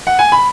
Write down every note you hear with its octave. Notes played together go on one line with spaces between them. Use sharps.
F#5
G#5
B5